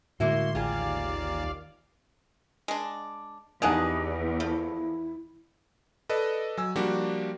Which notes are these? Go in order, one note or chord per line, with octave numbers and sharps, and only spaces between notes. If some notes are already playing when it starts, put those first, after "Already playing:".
A2 D3 G#3 A#3 E4 F#4 C6
A1 D#2 F4 G#4 D5 F5
G#3 D4
E2 D#3 D4 D#4 G4 G#4 F#5
F3 A3 E4
A4 B4 D5 D#5
F#3 G#5 E6
F3 G3 A#3 D4 F#4 G4